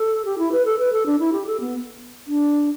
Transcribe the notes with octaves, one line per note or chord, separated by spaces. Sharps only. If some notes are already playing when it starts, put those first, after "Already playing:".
Already playing: A4
G4
E4
B4
A4
B4
A4
D4
E4
G4
A4
B3
D4